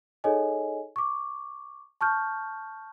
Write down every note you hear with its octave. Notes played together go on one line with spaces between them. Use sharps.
D#4 G#4 A4 C#5 D#5 G#5
C#6 D6
A5 C#6 F6 G6